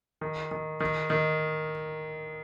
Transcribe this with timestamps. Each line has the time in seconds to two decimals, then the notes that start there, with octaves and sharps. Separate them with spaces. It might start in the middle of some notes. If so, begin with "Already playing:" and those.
0.21 D#3
0.51 D#3
0.80 D#3
1.10 D#3